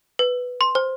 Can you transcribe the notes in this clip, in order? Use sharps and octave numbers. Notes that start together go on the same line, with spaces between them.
B4
C6
C5